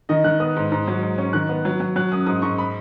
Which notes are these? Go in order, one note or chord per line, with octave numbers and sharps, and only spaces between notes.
D#3 D#5
D#3 F#6
B3 D#6
G#2
G#2
F#3
G#2
C#4
D#3 F#6
B3
F#3
F#3
F#3 F#6
F#2 D#6
G#2 D#6
G#2 C#6
B5